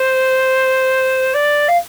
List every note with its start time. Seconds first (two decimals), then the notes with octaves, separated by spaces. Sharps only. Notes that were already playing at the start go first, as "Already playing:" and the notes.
Already playing: C5
1.33 D5
1.68 F5